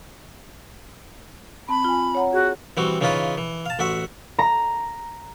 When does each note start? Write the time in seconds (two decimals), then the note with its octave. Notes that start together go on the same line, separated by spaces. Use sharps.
1.69 C4 A5 B5
1.84 F4 G#5
2.15 C#5 F#5 A#5
2.33 F#4 G#4
2.77 E3 G3 C4 F#4
3.01 C#3 E3 C#4 D#4 F4 B4
3.38 E3
3.66 F5 A5
3.79 A1 F#4 E5 F#5
4.39 A#5